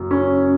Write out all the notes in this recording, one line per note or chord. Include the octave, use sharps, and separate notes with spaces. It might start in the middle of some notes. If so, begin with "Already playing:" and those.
Already playing: F#1 F#2
C#4